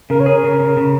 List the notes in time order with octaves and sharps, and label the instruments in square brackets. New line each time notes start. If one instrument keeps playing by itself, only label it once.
[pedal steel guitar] C#3 [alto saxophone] A#4
[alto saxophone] C#5
[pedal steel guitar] G#4 [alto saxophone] A#4
[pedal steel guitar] C#3
C#3
C#3